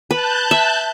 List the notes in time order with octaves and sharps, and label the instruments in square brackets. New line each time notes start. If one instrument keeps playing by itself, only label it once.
[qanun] B4 [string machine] A5 F#6 G6
[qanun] E5